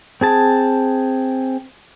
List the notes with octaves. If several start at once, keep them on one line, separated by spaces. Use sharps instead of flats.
C4 G#4 A5